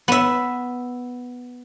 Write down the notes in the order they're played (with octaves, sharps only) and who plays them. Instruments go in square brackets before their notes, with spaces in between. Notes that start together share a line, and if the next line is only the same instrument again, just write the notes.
[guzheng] B3 E5